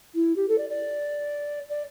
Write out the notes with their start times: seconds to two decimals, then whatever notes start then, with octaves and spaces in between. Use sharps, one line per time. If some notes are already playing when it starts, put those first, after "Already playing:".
0.15 E4
0.36 G4
0.48 A4
0.58 D5
0.70 D5
1.69 D5